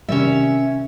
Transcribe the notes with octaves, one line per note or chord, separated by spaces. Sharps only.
C3 D#3 G3 C#4 E5